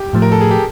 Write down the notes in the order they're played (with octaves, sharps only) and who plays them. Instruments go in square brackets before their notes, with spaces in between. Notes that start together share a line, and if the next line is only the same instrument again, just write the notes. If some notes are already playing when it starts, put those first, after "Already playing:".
Already playing: [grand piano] G4
[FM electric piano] A2 F3 A3
[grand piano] A#4
A4
G#4
G4